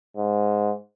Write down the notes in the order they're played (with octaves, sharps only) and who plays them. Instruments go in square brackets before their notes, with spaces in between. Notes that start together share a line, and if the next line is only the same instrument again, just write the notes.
[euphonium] G#2